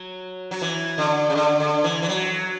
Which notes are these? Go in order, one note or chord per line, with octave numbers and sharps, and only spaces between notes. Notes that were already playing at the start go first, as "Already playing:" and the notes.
Already playing: F#3
F#3
E3
D3
C#3
D3
D3
E3
E3
F#3